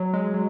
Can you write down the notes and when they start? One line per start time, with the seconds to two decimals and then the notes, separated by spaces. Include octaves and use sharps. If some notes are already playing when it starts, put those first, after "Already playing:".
Already playing: F#3
0.13 G#3
0.34 F#3